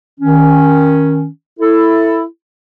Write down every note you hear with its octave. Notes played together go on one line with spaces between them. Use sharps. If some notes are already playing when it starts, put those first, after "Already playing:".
D#3 C#4
E4 A4